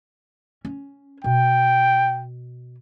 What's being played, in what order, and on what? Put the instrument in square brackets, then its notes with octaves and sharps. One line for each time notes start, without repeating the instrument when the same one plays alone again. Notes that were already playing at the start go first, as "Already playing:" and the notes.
[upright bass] C#4
[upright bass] B2 [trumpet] G5